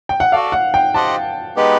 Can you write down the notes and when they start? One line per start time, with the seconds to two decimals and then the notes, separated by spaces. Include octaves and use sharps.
0.09 G5
0.20 F#5
0.32 F#4 A4 D5 F5
0.52 F#5
0.74 G5
0.94 G4 C5 D#5 F#5 A5
1.56 G#3 B3 D#4 G4 B4